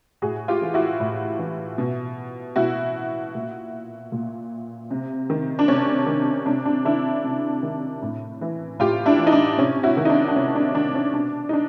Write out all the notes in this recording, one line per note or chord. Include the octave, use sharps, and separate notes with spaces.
A2 F#4 G#4
F4 G4
E3
E4 F#4
A2
E3
B2
B2 E4 F#4
A#2
A#2
C3
D#3
D4
C3 C#4
D#3
C3 D4
D4
D#3 D4 E4
C3
D#3
A2
E3
A2 F4 G4
D4 E4
E3
D#4
D4
C3 C#4
E4 F#4
D#3
D#4
D4
D4
C3 C#4
D4
D#3 D4
C#4
B2 D4
D#4
D4